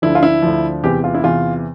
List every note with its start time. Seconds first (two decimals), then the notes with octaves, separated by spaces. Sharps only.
0.02 D2 D3 F3 E4
0.15 F4
0.23 E4
0.42 D2 D3 F3
0.83 E2 C3 E3 G4
1.04 F4
1.14 E4
1.23 E2 C3 E3 F4